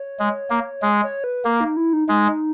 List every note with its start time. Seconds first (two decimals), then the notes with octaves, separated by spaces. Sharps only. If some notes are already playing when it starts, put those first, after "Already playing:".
Already playing: C#5
0.19 G#3
0.50 A#3
0.82 G#3
1.03 C#5
1.24 B4
1.45 A#3 A#4
1.60 D#4
1.77 E4
1.93 D#4
2.08 G#3 D#4